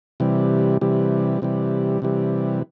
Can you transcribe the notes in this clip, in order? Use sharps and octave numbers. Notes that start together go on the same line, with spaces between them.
C3 E3 G3
C3 E3 G3
C3 E3 G3
C3 E3 G3